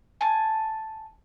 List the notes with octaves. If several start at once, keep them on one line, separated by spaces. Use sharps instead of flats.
G#5 A5